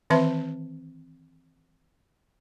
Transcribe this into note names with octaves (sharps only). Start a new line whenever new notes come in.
D#3 E3 C4 B4 E5 A5